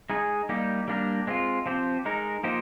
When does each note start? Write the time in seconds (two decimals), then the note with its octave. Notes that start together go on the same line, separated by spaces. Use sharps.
0.10 G#3 D#4 G#4
0.49 G3 A#3 D#4 G4
0.88 G3 A#3 D4 G4 A#4
1.27 G#3 C4 F4
1.66 F3 C4 G4 C5
2.05 G#3 D#4 A#4
2.43 F3 A#3 D#4 G4 C5